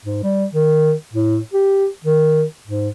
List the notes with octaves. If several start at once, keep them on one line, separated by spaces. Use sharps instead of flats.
G#2
G3
D#3
A2
G4
D#3
G#2